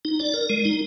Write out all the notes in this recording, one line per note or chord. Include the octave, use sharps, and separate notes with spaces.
D#4
D5
A#4
G#3
D#4